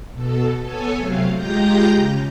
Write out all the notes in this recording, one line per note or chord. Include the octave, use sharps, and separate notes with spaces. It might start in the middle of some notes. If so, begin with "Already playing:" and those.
B2 A4
B3 A4 C#5 G#5
C3 F#3 A3 F5
G#3 F4 G4 A#5 G6 A#6
C#3